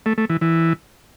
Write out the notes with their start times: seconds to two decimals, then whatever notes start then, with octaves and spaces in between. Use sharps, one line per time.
0.06 A3
0.18 A3
0.30 E3
0.41 E3